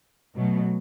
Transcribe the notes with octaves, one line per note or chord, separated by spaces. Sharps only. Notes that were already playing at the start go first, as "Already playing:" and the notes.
B2 F#3 A3